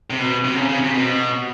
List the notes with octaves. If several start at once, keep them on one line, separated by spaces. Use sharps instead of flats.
C3
B2
C3
C#3
C#3
C3
B2